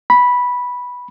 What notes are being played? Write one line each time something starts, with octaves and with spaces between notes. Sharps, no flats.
B5